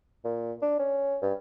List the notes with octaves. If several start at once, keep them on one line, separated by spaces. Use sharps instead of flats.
A#2
D4
C#4
G2